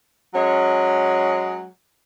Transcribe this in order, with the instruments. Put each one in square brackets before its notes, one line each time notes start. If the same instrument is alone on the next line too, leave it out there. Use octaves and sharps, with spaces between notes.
[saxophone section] F#3 G#3 C#4